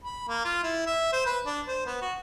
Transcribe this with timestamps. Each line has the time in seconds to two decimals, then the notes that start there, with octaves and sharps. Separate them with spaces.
0.04 B5
0.28 A#3
0.45 F4
0.63 E4
0.86 E5
1.13 C5
1.26 B4
1.46 D4
1.68 C5
1.86 B3
2.02 F#4